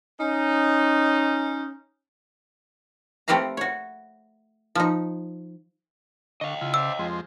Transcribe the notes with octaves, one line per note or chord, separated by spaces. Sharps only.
C#4 D#4
A3 C4 G4 B4 F5 A#5
F#4 C#5
F3 D#4
D3 D#5 F5 C#6
C#3 E4 F4
C5 D5 E5 E6
F2 F3 G#3 C6